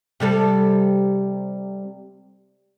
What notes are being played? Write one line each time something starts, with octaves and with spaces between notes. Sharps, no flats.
C3 G3 A4